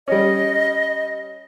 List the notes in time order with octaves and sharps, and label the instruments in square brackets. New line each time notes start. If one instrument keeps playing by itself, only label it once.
[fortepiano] G3 C#4 [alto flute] D#5